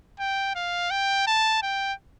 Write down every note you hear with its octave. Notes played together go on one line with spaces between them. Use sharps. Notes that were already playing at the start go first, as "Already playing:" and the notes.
G5
F5
G5
A5
G5